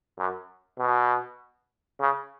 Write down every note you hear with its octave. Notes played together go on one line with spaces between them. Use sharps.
F#2
B2
C#3